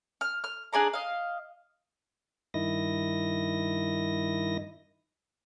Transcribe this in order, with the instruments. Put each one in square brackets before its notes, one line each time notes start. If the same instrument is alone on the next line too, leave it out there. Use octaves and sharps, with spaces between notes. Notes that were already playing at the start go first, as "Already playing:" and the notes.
[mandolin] F6
F6
D4 G#4 D5 A#5
D#5 F5
[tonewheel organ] G2 D#3 E4 D#5 A#6